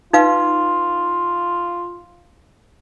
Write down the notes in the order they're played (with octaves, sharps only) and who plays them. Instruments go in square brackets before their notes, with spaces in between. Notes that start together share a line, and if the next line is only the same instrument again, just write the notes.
[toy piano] D#4 B4 F5 [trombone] F4